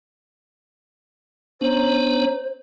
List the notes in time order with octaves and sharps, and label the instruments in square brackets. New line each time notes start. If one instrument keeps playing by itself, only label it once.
[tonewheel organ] B3 D4 [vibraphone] C#4 C#5 A#5 [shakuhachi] C5